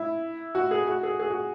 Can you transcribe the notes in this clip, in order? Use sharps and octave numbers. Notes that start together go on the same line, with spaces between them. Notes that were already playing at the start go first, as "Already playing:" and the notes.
Already playing: E4
F#4
G#4
F#4
G#4
G#4
F#4